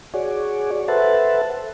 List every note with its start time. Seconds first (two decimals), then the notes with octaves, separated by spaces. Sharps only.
0.14 F#4 G#4 C#5 D5
0.88 A4 B4 C5 E5 F#5 A5